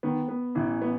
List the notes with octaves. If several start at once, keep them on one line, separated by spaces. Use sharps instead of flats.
D#3 B3
B3
A1 E3
B3